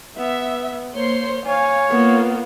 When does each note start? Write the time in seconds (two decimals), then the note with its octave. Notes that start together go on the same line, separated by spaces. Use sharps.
0.17 B3 E5
0.95 A#3 C5 C#5 C6
1.46 C#5 F5 G#5
1.90 A#3 B3 F4